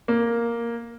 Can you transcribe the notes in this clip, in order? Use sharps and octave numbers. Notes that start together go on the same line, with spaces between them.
A#3